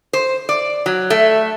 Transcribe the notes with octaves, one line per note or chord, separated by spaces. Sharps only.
C5
D5
F#3
A3